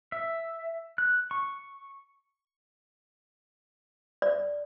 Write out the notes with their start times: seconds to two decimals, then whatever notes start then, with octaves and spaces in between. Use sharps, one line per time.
0.12 E5
0.98 F#6
1.31 C#6
4.22 D5